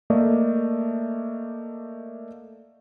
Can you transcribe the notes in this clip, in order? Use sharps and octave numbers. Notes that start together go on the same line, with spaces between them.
A3 A#3 D5 D#5